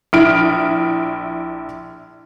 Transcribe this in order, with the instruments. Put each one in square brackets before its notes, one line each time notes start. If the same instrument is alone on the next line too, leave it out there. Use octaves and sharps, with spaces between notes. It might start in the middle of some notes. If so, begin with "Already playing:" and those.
[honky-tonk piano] A#1 E4 F6 D7